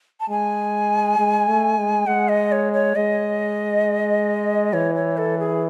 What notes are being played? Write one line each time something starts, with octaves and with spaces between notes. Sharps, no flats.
A5
G#3 G#5
G#3
A3
G#3
G#3 F#5
D#5
C#5
C#5
G#3 D#5
E3 C#5
C#5
A4
G#4